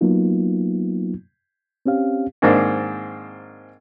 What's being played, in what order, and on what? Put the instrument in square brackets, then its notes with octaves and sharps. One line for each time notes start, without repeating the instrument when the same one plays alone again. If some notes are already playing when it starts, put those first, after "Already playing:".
[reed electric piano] F#3 A#3 B3 D#4 F4
C4 C#4 G4 F5
[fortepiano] G#2 D#3 A#3 C4 D4